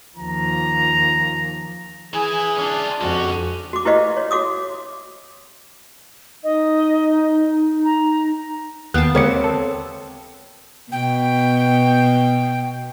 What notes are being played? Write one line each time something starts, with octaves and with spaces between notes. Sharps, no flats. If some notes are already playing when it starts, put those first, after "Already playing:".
D#2 F3 A#5
E3 E4 G#4 G#5
C#4 D4 F4
F2 G#3 C#4 F#4
F#4 D6
E4 G4 B4 C5 D#5 F5
C#5
F#4 F5 D6 D#6
D#4 D#5
A#5
D#2 B3 F5 G5 A5 F#6
G#3 A#3 C4 G4 A#4 C#5 C#7
A4
B2 G5